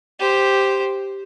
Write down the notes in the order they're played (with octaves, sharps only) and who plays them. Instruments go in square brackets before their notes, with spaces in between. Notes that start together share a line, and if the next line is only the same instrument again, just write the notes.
[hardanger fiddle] G4 C5